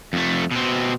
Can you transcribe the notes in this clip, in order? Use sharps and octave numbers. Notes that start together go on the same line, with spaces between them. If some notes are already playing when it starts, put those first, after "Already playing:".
F2 A3
B2 C4